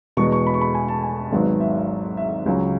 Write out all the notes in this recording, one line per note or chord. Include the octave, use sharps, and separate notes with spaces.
E2 B2 G#3 C#6
C#6
B5
C#6
B5
G#5
A5
G#5
G#1 G#2 F#3 B3
E5
E5
C#2 C#3 F#3 C#4